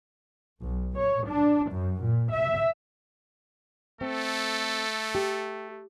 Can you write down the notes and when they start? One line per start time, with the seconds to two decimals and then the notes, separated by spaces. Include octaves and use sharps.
0.61 B1
0.98 C#5
1.28 D4
1.72 F#2
2.04 A#2
2.33 E5
4.01 A3 C4 A4
5.15 G4